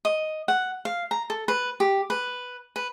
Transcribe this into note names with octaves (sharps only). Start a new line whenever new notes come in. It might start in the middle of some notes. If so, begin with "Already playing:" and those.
D#5
F#5
F5
A#5
A4
B4
G4
B4
B4